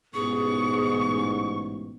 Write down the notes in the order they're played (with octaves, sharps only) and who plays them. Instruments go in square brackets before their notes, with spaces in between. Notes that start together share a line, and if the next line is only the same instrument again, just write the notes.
[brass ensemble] A1 G#2 [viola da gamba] B2 [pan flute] G#4 [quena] C#6